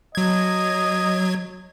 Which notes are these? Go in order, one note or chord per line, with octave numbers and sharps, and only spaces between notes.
F#3 D#5 G#6